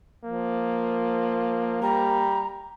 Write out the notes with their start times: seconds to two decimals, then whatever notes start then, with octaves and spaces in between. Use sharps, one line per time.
0.24 F3 A#3
1.82 G3 A#5